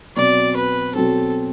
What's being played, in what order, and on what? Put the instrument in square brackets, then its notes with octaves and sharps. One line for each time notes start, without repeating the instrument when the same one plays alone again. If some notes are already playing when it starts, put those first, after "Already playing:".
[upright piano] B2 F#3 C4 [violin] D5
[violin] B4
[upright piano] B2 F#3 C4 [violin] A4